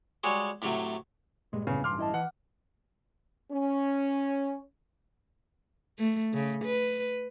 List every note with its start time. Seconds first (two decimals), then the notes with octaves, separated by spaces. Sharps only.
0.24 G3 G#3 F#4 G#4 C#5
0.62 A2 C3 F#3 A3
1.53 G2 A#2 G3 G#3
1.67 F1 A2 C#3 B3
1.84 A1 G2 C6 D6 F6
1.99 E4 D#5 A5
2.14 E3 F#5
3.52 C#4
5.99 A3
6.34 C#3
6.65 B4